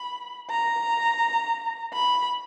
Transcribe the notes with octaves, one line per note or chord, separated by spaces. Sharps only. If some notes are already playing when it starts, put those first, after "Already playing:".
Already playing: B5
A#5
B5